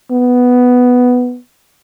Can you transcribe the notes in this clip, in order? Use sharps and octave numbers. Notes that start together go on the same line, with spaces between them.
B3